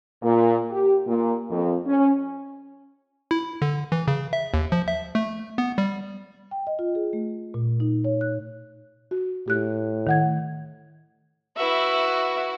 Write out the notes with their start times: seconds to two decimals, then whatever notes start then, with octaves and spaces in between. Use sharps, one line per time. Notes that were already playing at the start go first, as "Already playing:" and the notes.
0.23 A#2
0.70 G4
1.07 A#2
1.50 F2
1.86 C#4
3.31 E4
3.62 D3
3.92 E3
4.08 C#3
4.33 E5
4.54 D#2
4.72 F3
4.88 E5
5.15 A3
5.58 B3
5.78 G3
6.51 G5
6.67 D#5
6.79 F4
6.95 G#4
7.13 A3
7.54 A#2
7.80 D#4
8.04 C#5
8.21 F#6
9.11 F#4
9.48 A2 G4 F#6
10.07 D#3 F#5 G#6
11.57 E4 F#4 B4 E5